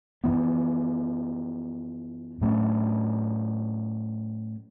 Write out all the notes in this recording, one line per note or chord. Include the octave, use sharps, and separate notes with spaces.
F#2 E3 B3
A2 F#3 A3 C#4